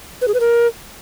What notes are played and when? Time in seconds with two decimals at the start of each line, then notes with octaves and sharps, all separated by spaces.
0.22 B4
0.28 G#4
0.34 B4
0.40 A#4